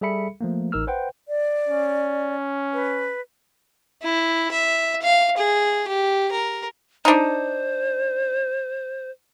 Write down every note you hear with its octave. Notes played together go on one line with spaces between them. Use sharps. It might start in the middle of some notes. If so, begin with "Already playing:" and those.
G3 G#4 A4 E5 B5 C#7
F3 A3 A#3
A1 D#4 A#4 E6 F6
B4 C5 F#5 G5
D5
C#4
B4
E4
E5
F5
G#4
G4
A#4
D4 D#4 C5